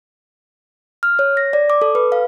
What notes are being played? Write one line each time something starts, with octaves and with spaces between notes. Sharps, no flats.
F6
C#5
A#6
D5
D6
A4
B4
F5